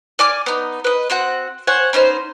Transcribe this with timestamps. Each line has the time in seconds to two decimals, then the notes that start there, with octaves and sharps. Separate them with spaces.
0.19 D5 G#5 D6 F6
0.46 B3 D#4
0.84 B4 D#5
1.10 C4 F#4 F#5
1.67 C5 C#5 F#5 G#5
1.93 B3 C#4 D#4 C5